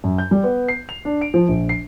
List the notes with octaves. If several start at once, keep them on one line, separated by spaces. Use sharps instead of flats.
F#2
G6
G3
B3
C7
F7
D4
D7
F3
A#1
C7